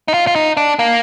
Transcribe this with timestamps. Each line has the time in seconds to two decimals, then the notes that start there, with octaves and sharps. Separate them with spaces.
0.08 D#4
0.14 F4
0.27 F4
0.35 D#4
0.57 D4
0.79 A#3